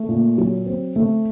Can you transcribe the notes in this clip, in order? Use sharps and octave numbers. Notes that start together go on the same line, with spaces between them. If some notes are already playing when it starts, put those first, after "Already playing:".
Already playing: A3
A#2
F#3
C4
A3